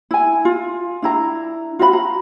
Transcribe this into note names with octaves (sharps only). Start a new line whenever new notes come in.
E4 G#5
F4
D4 E4 A#5
F4 F#4 D#5 B5
A#5